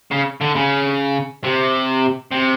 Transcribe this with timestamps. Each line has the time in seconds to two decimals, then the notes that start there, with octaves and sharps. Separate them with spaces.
0.11 C#3
0.41 D3
0.55 C#3
1.44 C3
2.31 C3